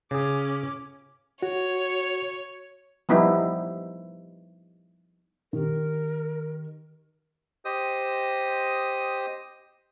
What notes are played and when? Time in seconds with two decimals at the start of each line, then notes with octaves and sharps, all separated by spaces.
0.11 C#3 C#4 G#4 D6
1.42 F#4 C#5
3.09 F3 G3 B3 D#4 E4
5.53 D#3 G4 A#4
7.65 G4 C5 D#5 D#6